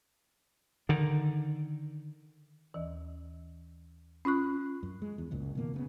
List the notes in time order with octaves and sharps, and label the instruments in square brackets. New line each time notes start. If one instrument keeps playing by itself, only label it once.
[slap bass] D3 D#3
[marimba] D#2 E3
C#4 F4 C#6 F#6
[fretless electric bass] F#2
G#3
E2
F#1 C#2 F#2 A#2
B2 D#3 A3 A#3
C#3 A#3 B3